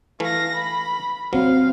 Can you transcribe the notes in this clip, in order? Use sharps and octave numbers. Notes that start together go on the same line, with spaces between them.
E3 A3 F5 A#6
B5
F#3 C4 C5 F5